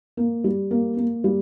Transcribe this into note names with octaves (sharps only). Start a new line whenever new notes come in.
A#3
G3
A#3
A#3
G3